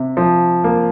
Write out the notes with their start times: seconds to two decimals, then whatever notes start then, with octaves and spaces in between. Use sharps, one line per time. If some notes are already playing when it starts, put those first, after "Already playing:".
Already playing: C3
0.17 F3
0.64 A#3